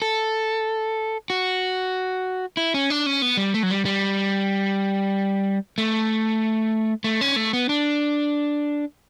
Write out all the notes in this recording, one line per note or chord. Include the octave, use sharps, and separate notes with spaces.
A4
F#4
E4
C#4
D4
C#4
B3
G3
A3
F#3
G3
G3
A3
A3
C#4
A3
B3
D4